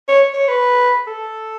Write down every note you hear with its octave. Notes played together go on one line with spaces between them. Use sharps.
C#5
C#5
B4
A4